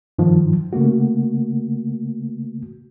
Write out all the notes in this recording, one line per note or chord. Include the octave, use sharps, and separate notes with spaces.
G2 D#3 F3
C#3 A3 A#3 F#4